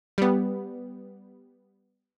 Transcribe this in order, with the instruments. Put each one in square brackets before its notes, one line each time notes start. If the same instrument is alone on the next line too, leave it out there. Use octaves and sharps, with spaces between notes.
[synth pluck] G3 B3